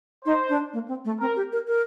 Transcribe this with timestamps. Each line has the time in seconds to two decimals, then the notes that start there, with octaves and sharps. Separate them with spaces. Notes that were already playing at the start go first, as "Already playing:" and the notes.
0.25 D#4 C5
0.49 D4
0.73 A#3
0.88 C4
1.05 A3
1.20 C4 A#4
1.36 G4
1.52 A#4
1.68 A#4